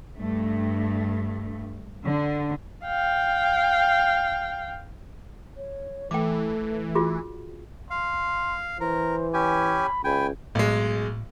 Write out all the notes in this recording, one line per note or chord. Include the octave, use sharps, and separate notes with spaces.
G2 A3
D3
F5 G5
C#5
E3 A3 G5 D6
F4 F#4 G#4
F5 C6
E3 A#4 C5
C#4 G4 G#5 B5
C#2 G5 G#5 B5
B1 A2 G#3